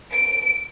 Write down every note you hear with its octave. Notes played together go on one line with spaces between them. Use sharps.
D7